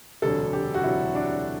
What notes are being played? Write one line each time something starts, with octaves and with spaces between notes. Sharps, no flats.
E1 D2 C3 F#3 A4
G4
F#4
E1 D2 C3 F#3 E4
D4